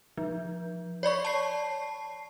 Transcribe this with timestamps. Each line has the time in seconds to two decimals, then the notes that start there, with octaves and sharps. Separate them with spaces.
0.18 F3
1.03 C#5 D5 B5 C#6
1.25 A5 C7